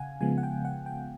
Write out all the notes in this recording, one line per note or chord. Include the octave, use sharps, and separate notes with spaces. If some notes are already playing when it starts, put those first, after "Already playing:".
Already playing: C#3 F5 F#5 G#5
C#3 F3 G#3 B3 G#5
F#5
G5
F#5
G5